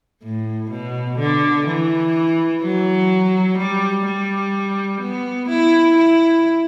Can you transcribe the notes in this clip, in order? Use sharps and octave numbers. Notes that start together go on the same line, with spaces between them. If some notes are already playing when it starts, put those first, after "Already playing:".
A2
B2
D3
E3
F#3
G3
G3
B3
E4
E4